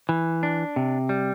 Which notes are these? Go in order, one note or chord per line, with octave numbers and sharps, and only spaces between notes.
E3
D4
C3
G3